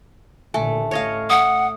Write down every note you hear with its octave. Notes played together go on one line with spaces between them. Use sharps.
A1 A#2 D3 A3 G#5
A2 C#5 D#5 F5
F#5 D#6